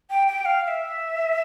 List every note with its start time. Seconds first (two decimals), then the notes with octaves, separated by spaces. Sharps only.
0.10 G5
0.28 G5
0.45 F5
0.63 F5
0.67 E5